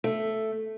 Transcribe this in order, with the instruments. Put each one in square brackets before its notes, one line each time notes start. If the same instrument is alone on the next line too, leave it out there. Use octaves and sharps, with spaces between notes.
[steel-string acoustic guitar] A3